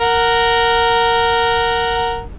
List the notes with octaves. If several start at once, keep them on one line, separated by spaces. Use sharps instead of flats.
A#4 F#5